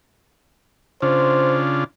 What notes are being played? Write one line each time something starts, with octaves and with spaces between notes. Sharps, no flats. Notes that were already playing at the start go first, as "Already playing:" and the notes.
C#3 D4 F4 C5